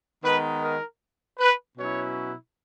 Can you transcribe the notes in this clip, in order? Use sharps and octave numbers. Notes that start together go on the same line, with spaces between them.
D#3 G#3 B3 D#4 B4
A#4
B4
B2 F#3 C#4 E4 C#5